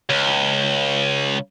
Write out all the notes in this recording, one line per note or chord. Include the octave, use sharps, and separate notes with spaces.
C#2